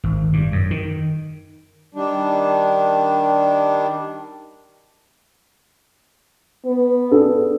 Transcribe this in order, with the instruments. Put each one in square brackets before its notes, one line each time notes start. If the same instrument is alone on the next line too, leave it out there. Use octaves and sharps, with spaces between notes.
[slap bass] G#1
G2
F#2
D#3
[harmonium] D#3 G3 D4
[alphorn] B3
[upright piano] D4 G#4 A4